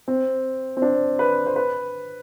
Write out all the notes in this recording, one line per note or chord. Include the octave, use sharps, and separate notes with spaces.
C4
C4
D4
B4
C5
B4